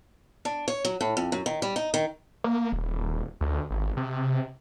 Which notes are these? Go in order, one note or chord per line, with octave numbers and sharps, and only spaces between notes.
D4
C#5
F#3
A2
F2
F#2
D#3
G3
D#4
D#3
A#3
D#1
D2
G#1
C3